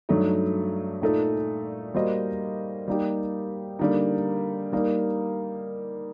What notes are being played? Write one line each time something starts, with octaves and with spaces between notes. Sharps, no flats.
G2 F#3 A3 D#4
A#2 A3 D#4 A4
G3 A#3 F#4 C5 D#5
G3 A#3 D#4 G4
D3 G3 A#3 D#4
G3 A#3 D#4